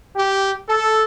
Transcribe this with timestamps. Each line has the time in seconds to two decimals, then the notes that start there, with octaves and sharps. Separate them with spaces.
0.16 G4
0.68 A4